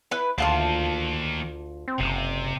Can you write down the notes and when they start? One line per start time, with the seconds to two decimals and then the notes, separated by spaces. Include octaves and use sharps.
0.11 E4 B4
0.38 D2 D#3 A#3 F4 F5 A5
1.88 C4
2.00 F#1 C3